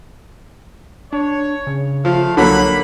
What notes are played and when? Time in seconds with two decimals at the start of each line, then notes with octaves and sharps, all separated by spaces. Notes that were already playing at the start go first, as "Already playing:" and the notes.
1.13 D4 C#5
1.67 C#3
2.05 F3 A3 F5
2.37 C2 D3 F#3 A#3 B5